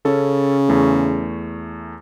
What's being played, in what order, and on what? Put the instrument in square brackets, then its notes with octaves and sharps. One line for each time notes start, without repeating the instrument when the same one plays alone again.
[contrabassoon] C#3 [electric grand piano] C#4 A4
[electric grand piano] E2 A3